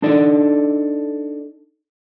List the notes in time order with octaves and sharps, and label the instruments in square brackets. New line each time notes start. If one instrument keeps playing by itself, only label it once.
[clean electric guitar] D4 D#4 A4 D5